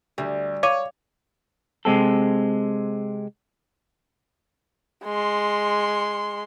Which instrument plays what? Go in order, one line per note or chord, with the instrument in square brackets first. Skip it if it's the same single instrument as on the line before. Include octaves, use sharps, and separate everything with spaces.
[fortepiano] D2 [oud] G3
[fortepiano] C#5 [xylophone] F5 D6 D#7
[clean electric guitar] C3 G#3 C4 A4
[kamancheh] G#3 C6